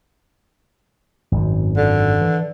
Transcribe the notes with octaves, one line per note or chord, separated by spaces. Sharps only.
G#1 F#2
D3
E3